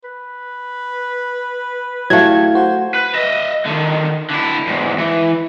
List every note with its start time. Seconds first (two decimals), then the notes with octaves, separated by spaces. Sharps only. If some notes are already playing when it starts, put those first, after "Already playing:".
0.04 B4
2.10 F#3 A3 E4 G4 F5 G#6
2.55 F#4 C5
2.94 B4
3.14 D#5 E5
3.66 D3 D#3
4.30 D3 E4
4.67 E2 G#2
4.98 E3